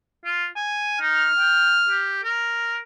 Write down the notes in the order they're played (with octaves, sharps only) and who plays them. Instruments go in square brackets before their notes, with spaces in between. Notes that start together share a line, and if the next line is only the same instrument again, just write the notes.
[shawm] F4
G#5
[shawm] D#4 [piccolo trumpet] F6
[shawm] G5
G4
A#4